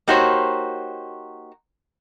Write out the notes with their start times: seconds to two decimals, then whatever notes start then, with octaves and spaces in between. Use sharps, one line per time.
0.08 A#3 D#4 F#4 G4 C5 C#5